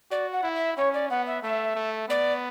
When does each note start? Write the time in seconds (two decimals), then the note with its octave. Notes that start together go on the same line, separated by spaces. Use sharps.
0.11 F#4 D5
0.32 F#5
0.43 E4
0.55 E5
0.77 C#4 C#5
0.94 D5
1.10 B3 F#5
1.26 E5
1.43 A3 E5
1.75 A3
2.08 B3 D5